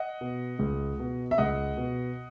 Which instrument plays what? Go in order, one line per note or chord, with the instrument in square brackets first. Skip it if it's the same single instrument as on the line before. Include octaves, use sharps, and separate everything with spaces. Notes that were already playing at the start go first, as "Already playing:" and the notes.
Already playing: [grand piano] D#5 F#5
B2
C#2
B2
E5
C#2 D#5 F#5
B2